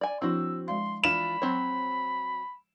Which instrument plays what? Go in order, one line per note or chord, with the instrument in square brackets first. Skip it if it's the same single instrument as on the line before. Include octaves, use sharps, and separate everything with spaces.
[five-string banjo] D5 G#5
[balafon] F3 D4 E4 [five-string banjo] C4 F#4 [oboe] E6
[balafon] G#3 D5 F5 [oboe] C6
[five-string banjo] E3 D4 F4 [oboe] B5 [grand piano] E7
[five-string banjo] F#3 C4 C#5